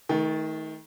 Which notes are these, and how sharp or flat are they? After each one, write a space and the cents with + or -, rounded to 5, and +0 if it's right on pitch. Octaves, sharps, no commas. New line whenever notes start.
D#3 +30 A3 -15